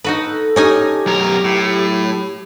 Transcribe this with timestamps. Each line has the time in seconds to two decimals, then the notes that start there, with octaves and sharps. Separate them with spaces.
0.04 D#4 F#4 A4 B4
0.56 C#4 D#4 G4 G#5
1.06 B1 F#3 A#4
1.44 A2